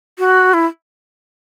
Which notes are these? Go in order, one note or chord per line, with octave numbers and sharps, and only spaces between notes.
F#4
E4